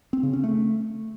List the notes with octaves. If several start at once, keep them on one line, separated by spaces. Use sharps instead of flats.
C4
C#3
C#4
A3